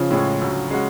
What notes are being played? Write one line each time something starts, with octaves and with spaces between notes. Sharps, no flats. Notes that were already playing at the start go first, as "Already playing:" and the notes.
Already playing: C#3 F3
A2 G#3 C#4 G#4
D2 D3 F#3
G#3 C#4 F#4